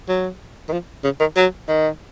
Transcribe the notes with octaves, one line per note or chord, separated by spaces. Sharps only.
F#3
D#3
F3
C#3
D#3
F#3
D#3